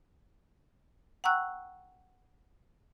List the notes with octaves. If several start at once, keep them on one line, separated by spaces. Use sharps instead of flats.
F#5 G5 A#5 C#6 E6 F#6